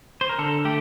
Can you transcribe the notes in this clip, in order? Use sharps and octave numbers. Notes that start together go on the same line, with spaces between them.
C5
A#4
D3 A4
A3 G4